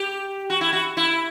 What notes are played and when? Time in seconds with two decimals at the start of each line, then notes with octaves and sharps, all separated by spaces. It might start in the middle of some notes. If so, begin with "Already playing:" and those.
Already playing: G4
0.50 F#4
0.61 E4
0.73 F#4
0.97 E4